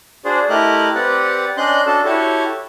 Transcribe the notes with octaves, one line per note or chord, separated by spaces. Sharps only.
D4 F#4 G#4 C5 D5
A3 E4 G4 A#4 D#5 F#6
C4 G4 B4 D5 F#5
C#4 D4 D#5 C6 F#6 G6
D4 F#4 A4 A5
E4 F#4 G4 A4 C#5